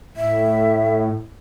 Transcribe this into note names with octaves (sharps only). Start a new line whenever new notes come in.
A2 E5